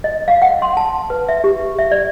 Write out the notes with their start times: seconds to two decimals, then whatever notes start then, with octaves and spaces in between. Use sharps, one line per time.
0.04 D#5
0.28 F5
0.42 F#5
0.62 C6
0.77 A5
1.10 B4
1.29 E5
1.44 G4
1.79 E5
1.92 D5